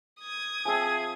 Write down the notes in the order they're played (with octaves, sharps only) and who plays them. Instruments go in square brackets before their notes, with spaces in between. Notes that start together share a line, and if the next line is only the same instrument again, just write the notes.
[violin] D#6 G#6
[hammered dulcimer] F3 C4 [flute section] G#4 E5 [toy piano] G#5